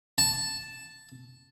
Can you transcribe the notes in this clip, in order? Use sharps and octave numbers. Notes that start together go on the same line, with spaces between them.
A5